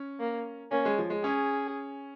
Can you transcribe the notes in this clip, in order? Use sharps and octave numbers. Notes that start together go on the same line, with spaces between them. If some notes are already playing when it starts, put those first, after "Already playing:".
Already playing: C#4
A#3
A#3 C#4
G#3
F3
G#3
C#4 G#4